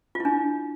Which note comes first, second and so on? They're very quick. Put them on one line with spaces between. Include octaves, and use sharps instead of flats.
F4 E4 D4